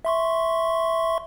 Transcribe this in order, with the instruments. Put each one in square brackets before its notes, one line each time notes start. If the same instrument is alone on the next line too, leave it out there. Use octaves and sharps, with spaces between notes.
[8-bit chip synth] E5 C6 C#6